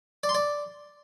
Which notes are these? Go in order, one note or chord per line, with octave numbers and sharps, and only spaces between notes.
D5
C6
D5